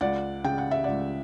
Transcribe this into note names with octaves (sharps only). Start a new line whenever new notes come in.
C#2 D5 F#5
C#3 G5
F#5
E5
C#2 D5 F#5